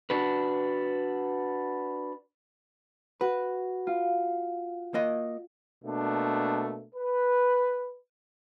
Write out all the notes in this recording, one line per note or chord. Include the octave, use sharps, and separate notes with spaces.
D4 F#4 B4
F#4 B4
F4
A#3 D#5
B2 A3 A#3 D4
B4